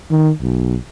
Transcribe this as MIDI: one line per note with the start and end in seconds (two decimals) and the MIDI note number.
0.11 0.30 51
0.42 0.76 35